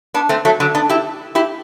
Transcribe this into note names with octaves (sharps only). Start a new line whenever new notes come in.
B3 D4
A3 C4
F#3 A3
D3 F#3
B3 D4
E4 G4
E4 G4